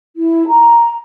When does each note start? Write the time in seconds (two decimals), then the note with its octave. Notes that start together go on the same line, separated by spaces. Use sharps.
0.16 E4
0.48 A#5